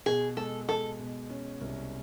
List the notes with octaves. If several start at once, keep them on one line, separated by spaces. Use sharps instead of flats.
B2 G#4
G#3 A4
G#3 A4
B2
C#4
C2